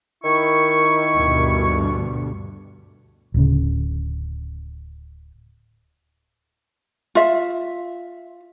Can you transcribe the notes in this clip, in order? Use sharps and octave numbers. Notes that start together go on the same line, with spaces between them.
D#3 E4 C#6
D2 G2 B2
D1 C#3
F4 E5